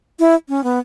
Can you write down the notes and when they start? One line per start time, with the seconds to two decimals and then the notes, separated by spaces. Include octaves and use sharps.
0.19 E4
0.49 C#4
0.64 B3